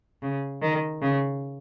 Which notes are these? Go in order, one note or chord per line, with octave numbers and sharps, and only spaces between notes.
C#3
D#3
C#3